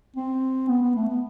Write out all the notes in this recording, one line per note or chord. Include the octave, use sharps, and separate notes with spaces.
C4
B3
B3
A3
B3